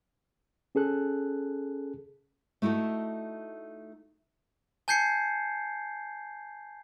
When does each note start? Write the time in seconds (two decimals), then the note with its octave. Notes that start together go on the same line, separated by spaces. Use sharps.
0.75 C#4 G#4 A4 F#6
2.62 A3 D#4 E4 F#4 A4
4.88 G#5 A5 G6 G#6 C7 C#7